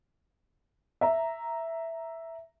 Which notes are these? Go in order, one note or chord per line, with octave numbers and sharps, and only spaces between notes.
E5 A#5